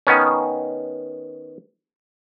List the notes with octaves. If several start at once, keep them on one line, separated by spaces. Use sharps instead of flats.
D#3 B3 C#4